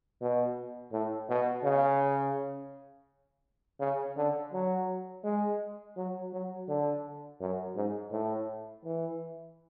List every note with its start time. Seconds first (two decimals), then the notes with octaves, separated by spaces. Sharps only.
0.22 B2
0.92 A2
1.29 B2
1.64 C#3
3.80 C#3
4.17 D3
4.53 F#3
5.24 G#3
5.97 F#3
6.33 F#3
6.69 D3
7.41 F#2
7.76 G#2
8.12 A2
8.84 E3